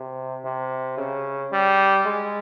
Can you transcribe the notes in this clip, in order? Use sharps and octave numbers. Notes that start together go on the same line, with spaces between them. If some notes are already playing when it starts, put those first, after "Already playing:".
Already playing: C3
C3
C#3
G3
G#3